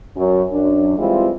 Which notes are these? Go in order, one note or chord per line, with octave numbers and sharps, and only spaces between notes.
F#2 F#3 C#4
F#2 D4
E3 G3 G#3 C4 E4 F4